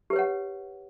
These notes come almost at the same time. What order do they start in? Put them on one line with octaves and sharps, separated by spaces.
G4 B4 C#5 F#5